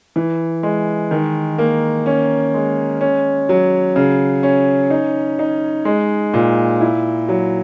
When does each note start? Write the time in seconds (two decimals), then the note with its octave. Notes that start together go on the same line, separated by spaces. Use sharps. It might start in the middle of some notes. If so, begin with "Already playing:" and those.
0.16 E3
0.63 G#3
1.11 D#3
1.58 A#3
2.06 C#4
2.54 G#3
3.01 C#4
3.49 F#3
3.96 C#3
4.43 C#4
4.90 D#4
5.39 D#4
5.85 G#3
6.34 A#2
6.81 E4
7.29 F#3